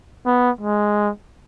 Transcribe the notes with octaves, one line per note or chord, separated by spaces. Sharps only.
B3
G#3